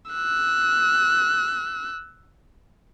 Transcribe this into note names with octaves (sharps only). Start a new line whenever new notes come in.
E6 F#6